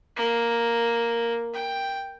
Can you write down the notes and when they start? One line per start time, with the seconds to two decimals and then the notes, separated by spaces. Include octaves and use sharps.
0.17 A#3
1.54 G5